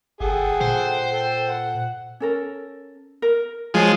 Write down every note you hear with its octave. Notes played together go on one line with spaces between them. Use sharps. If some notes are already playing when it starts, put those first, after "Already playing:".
G1 G#4 A4 F#5 G5
A#2 C5
A4 G5
F#5
C#4 A4 A#4
A#4
F3 G#3 F#4 C#5